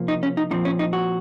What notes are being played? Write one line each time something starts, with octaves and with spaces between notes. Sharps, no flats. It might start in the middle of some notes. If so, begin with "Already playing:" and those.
Already playing: C3 F3 A#3
D#4
C#4
D#4
A#2 F3 C4 D#4
C#4
D#4
F#4